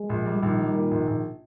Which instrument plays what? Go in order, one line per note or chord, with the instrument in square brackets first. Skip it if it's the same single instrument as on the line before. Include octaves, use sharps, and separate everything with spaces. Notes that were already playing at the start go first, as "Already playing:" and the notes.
Already playing: [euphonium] G#3
[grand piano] A#1
G3
[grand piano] A#1 [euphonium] D#3
[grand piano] G3
A#2
A#1
A#1